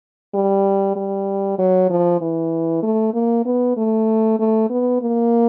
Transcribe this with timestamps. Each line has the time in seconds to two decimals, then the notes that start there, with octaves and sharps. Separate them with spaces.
0.34 G3
0.96 G3
1.59 F#3
1.90 F3
2.21 E3
2.83 A3
3.14 A#3
3.46 B3
3.77 A3
4.39 A3
4.70 B3
5.02 A#3